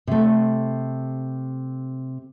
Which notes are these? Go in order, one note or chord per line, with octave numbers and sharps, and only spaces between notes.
C3 A3